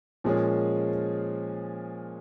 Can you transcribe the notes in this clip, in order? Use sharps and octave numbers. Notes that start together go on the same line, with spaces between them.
A#2 F3 G#3 C#4 G#4